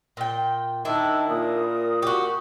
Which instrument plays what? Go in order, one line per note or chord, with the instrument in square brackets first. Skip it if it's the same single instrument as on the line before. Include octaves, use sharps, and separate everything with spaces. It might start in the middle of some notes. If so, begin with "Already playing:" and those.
[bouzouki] A#2 G5
[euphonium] D#3 [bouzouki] D4 E4 [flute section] A5 E6
[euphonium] A#2 [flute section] A#4 D#6
[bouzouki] F#4 G4